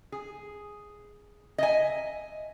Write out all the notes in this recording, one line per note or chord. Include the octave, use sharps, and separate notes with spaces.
G#4
D#5 E5 G#5